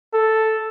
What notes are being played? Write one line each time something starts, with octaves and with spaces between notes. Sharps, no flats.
A4